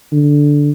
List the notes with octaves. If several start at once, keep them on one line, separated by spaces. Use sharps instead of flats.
D3